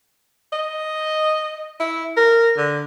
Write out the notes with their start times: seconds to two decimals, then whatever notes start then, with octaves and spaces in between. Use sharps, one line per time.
0.53 D#5
1.80 E4
2.17 A#4
2.57 D3